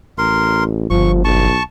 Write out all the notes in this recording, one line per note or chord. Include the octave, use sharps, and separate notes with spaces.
A1 A#4 C6
G1 F3 C#6
B1 A5 C#6